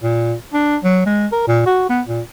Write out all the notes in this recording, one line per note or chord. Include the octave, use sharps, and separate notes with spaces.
A#2
D4
F#3
G#3
A#4
A#2
F#4
B3
A#2